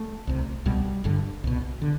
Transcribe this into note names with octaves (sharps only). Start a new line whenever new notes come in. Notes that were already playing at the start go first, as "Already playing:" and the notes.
Already playing: A3
C2 C3
C2 B2 G3
G1 G2 D3
C2 B2
D3